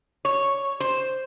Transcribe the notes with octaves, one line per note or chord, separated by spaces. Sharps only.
C#5
C5